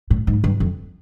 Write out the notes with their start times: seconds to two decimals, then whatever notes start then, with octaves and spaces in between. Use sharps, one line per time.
0.10 A2
0.27 G#2
0.44 G2
0.60 F2